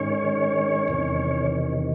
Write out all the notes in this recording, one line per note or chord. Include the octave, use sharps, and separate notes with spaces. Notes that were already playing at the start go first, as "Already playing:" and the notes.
Already playing: G#2 D#3 C#4 C#5
E2 C3 D#3